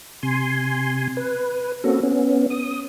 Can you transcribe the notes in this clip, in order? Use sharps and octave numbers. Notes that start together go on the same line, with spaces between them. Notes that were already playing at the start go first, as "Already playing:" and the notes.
C3 G#5 C6
B4
A#3 C4 C#4 F#4 A4
B3 C#4
D#6